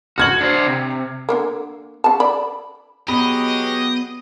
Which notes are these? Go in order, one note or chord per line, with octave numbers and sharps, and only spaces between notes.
F#4 F6 G#6 F#7
D4 C5
C3
D3 D#3 A#3
C#3 A5
D5 B5
F#3 B3 G4 G#4 D#5 B5